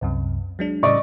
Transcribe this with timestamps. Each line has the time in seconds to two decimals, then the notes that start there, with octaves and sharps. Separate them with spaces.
0.01 C2 F#2 C3
0.59 F#3 G#3 D4
0.83 A2 C#3 G3 D5 D#5 C#6